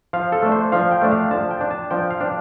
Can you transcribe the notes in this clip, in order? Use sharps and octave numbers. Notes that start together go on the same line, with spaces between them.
F3 F5
A4
A3 D4
C5
F3 F5
G5
A3 D4
F5
F3 A5
G5
D4
A5
F3 G5
F5
D4